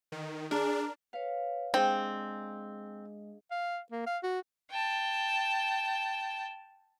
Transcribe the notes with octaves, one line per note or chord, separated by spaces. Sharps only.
D#3
D4 G#4 A#4
B4 C#5 F5
G#3 C4 D4 G#4 D#5 G5
F5
A#3
F5
F#4
G5 A5